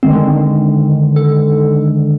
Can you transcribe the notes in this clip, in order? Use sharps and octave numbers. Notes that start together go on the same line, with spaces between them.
D3 D#3 G#3 C4
A4